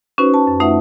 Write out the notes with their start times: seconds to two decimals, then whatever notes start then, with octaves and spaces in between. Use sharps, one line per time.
0.18 C#4 D#4 F#4 B4 C5
0.34 A5
0.47 F#2
0.60 A3 D#4 F4 B4 E5 F#5